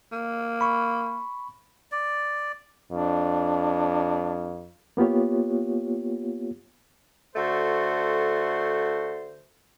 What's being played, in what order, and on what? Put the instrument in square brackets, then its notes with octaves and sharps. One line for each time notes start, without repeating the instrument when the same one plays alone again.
[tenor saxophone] A#3
[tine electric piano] B5 C#6
[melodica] D5
[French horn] F2 [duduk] D4
[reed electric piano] A#3 B3 F4 G4 C#5
[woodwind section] D3 A3 F#4 A4 C5